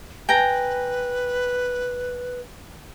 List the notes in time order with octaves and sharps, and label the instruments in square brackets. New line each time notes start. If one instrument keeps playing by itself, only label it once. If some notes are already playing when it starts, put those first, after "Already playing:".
[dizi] B4 [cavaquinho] G5 G#5 A#5